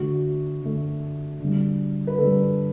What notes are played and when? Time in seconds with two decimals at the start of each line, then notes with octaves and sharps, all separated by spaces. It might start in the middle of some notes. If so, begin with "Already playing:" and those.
Already playing: D3 A3 F#4
0.61 D3 A3
1.40 D3 G3
2.07 B4
2.18 D3 G3 A4